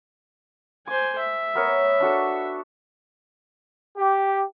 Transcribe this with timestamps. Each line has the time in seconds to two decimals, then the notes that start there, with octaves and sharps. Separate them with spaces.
0.87 C5 G#5 D6
1.18 E5
1.55 B3 A#4 C#5
2.00 D4 F#4 A4
3.98 G4